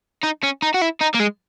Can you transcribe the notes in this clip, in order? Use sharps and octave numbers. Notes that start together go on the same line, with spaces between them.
D#4
C#4
D#4
F#4
E4
D#4
A#3
G#3